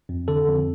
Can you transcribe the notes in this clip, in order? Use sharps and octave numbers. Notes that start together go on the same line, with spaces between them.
F2
D3 A4
F2